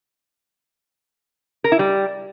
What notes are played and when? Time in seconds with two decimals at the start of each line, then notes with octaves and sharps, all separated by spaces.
1.64 A#4
1.72 E4
1.79 G3